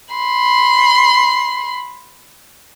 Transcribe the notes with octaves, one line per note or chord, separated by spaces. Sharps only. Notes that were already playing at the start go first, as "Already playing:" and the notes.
B5 C6